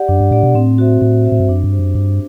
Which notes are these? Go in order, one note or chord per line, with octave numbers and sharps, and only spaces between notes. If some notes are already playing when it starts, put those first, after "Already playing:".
Already playing: G4 D5 F#5
F#2 D4
G2
A2 G4 D5 F#5
B2
A2 C4
F#4 C5 E5
A2 C4
F#4 C5 E5
A2
G2
F#2 D4
G2
G4 C5
F#2
G2 D4